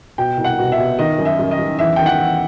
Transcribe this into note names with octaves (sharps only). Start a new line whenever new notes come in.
B2 G5
C2
F#5
B2
E5
B2
D#3 D#5
F#2
E5
F#2
D#5
F#2
E2 E5
D#3 G5
F#5
E2